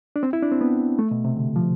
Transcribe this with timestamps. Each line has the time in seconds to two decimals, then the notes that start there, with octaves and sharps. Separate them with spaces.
0.16 D4
0.23 C4
0.33 E4
0.43 D4
0.51 C4
0.61 B3
0.99 A3
1.11 B2
1.25 C3
1.37 D3
1.56 F3